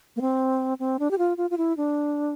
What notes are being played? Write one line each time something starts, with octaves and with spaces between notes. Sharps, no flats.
A#3
C4
C4
D4
G4
F4
F4
F4
E4
D4